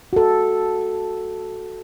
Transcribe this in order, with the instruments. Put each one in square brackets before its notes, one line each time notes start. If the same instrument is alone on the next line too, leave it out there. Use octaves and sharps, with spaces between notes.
[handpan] F#4 A4